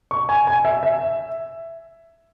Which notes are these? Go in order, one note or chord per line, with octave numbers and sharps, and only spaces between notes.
C#6
G#5
G#5
E5
E5